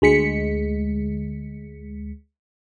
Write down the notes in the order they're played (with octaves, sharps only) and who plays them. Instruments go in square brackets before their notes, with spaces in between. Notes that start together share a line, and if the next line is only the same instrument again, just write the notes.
[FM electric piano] D2 G#3 B6 C#7